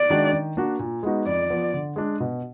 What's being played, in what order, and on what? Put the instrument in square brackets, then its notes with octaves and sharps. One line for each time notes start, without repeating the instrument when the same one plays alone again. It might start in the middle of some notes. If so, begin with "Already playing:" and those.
Already playing: [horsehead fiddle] D5
[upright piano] D#3 G#3 D4 F#4
D#3
A#3 D4 F#4
A#2
G#3 B3 D#4 F#4
[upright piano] F2 [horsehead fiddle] D5
[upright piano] F3 B3
D3
G#3 D4
B2